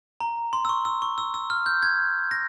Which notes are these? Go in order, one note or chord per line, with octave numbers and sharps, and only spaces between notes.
A#5
C6
E6
C#6
E6
C#6
E6
E6
F6
G6
G#6
A#6